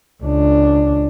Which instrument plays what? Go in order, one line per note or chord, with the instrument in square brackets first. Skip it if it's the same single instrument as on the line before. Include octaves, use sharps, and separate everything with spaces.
[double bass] C#2 D4